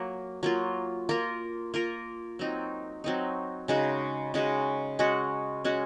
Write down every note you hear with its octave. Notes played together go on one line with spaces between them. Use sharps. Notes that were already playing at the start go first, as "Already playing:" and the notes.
Already playing: F#3 A#3
F#3 A#3 F4
A#3 F4 A#4
A#3 F4 A#4
F#3 C4 D#4
F#3 C4 D#4
C#3 G#3 D#4 F#4
C#3 G#3 D#4 F#4
G#3 C#4 F#4
G#3 C#4 F#4